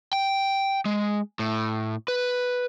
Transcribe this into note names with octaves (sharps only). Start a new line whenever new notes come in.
G5
G#3
A2
B4